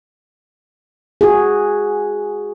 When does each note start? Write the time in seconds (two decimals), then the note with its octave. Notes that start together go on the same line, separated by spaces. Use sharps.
1.21 F#4 G#4